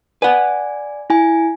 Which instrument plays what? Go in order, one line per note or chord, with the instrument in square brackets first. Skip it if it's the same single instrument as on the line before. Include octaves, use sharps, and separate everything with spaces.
[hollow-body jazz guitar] B4 F#5 [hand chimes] D5 G#5
[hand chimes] E4 G#5